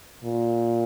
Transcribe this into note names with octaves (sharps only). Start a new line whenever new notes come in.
A#2